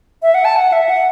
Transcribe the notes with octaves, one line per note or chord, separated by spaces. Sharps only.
E5
F#5
A5
F#5
E5
F#5